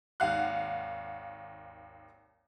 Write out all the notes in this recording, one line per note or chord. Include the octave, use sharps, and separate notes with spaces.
G#1 D#2 F5 F#5 F#6